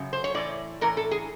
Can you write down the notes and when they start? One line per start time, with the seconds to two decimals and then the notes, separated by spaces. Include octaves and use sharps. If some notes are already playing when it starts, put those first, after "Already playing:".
Already playing: F#2 C#3
0.13 C5
0.24 C#5
0.34 A2 E3 D5
0.81 A2 E3 A#4
0.97 A4
1.11 G#4